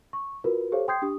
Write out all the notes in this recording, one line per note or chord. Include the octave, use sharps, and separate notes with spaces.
C#6
F4 F#4 A#4 B4
G4 A4 C5 C#5 F5
G5 C6 D#6 G6 G#6 C7
D4 G4 D#6